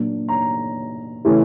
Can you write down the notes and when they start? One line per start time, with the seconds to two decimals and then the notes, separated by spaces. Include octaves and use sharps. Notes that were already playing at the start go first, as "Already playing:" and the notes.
Already playing: A#2 F#3 A#3 D4
0.29 A#5
1.25 C#3 E3 A3 C#4